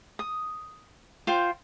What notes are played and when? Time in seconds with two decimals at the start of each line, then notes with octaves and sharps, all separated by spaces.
0.19 D#6
1.27 F4 C5 G5